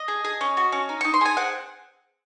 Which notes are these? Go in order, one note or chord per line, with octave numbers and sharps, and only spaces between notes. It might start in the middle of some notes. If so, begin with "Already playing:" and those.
Already playing: D#5
G#4
G#4
C#4
F#4
C#4
D#4
D#4 C#6
C6
G#4 G#5
C4 F#5